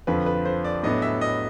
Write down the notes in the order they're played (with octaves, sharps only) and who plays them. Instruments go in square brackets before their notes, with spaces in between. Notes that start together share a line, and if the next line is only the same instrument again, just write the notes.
[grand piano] F2 D3 F3 [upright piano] B4
[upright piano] B4
C5
D5
[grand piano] A2 F#3 B3 D4 [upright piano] D#5
[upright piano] E5
D#5